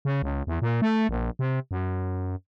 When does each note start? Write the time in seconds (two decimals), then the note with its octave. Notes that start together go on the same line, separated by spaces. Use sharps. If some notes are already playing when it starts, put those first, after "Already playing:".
0.05 C#3
0.22 C#2
0.47 E2
0.62 A#2
0.82 A3
1.09 A#1
1.39 C3
1.71 F#2